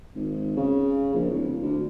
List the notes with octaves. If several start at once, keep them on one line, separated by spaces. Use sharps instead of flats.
G#1
C#3
A#1
D1
D2